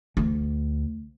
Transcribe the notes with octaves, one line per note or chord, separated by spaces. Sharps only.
D2